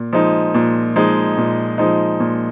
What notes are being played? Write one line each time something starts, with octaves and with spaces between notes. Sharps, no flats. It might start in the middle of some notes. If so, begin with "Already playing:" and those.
Already playing: A#2
F3 G#3 D#4
A#2
F3 G#3 D#4
A#2
F3 G#3 D#4
A#2